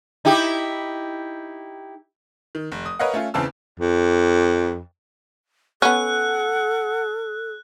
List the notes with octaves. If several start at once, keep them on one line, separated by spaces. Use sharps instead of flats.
D#4 E4 G4
D#3
F1
D#6
A#4 B4 C#5 D#5 F5 F#5
A3 C#4 F4
E2 C#3 E3 C4 A5 E6
F2
B3 C#4 A4 F#5 F#6